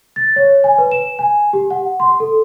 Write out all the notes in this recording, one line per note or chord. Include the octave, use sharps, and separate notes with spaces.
A6
C#5
G#5
B4
E7
G#5
G4
F#5
C6
A4